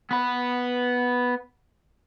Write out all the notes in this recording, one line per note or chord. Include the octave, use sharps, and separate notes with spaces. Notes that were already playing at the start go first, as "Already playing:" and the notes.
B3 B4